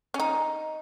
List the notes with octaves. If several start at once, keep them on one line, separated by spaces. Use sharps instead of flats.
C#4
D#4